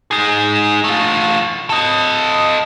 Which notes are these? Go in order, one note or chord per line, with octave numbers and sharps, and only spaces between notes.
D#4 G#4
A3 F4
A4 D#5